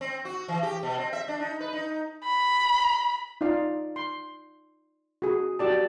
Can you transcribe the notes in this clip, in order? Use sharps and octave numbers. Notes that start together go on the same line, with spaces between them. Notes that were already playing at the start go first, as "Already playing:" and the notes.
C4
F#4
E3
G4
B2
C4
E5
D4
D#4
B4
D#4
B5
D#4 F4 D5 F5
C6
F#4 G#4
F#4 G4 D5 A5